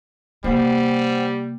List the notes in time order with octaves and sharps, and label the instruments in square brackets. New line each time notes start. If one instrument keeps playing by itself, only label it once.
[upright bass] C3 A#3 [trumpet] G3 [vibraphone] C5 F#5 G5